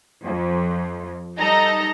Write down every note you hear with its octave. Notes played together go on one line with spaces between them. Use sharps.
F2
G3 D#4 A4 D#5 A#5 A#6